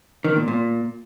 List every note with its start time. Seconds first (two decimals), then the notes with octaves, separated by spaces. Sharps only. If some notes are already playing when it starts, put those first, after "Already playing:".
0.24 D#3
0.36 A#2
0.48 A#2